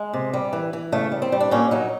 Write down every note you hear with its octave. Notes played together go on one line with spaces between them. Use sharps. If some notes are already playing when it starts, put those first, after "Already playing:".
Already playing: G#3
C3
G3
E3
E3
C#3 A3
G3
C4
G3
D4
A#2 C#4
F#3 D#4